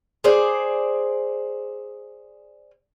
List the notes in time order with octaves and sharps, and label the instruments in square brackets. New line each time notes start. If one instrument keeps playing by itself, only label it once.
[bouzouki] G#4 C5 D5